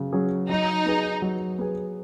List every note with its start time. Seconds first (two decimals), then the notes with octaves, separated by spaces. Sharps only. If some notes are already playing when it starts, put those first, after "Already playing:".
Already playing: C#3 F#3
0.13 F#3 C#4 G#4
0.49 F#3 D#4
0.86 B3 G#4
1.22 F#3
1.58 B3 G#4